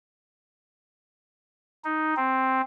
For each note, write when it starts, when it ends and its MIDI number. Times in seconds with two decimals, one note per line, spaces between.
1.84 2.14 63
2.16 2.61 60